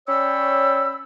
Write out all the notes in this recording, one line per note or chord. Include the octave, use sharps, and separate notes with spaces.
C#4 C#5 D5 G5 B5 E6